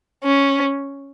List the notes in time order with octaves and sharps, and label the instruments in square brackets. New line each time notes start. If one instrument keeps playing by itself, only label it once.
[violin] C#4